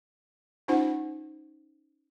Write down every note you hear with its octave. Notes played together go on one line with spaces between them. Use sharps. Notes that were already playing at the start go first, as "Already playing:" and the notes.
C#4 D#4 F4 C5 F#5